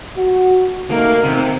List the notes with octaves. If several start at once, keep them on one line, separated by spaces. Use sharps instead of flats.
F#4
A3 A#3 D#4
C3 D#3